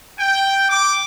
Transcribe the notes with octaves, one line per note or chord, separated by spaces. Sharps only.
G5
D6